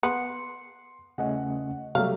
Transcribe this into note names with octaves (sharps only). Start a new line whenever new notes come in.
B3 C6 C#7
C#3 A3 C#4 D#5 F#5
C3 F#3 G3 A3 G4 F5